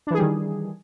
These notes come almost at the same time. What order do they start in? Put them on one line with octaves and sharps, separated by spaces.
D4 E3 G#4 G3 D#3